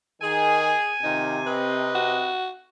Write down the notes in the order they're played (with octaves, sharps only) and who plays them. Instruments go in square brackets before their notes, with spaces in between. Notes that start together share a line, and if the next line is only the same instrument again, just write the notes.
[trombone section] D#3 [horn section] G#4 [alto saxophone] G#5
[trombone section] C3 [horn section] D#3 D#4 F4
[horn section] C4 B4 D#5
[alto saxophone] F#4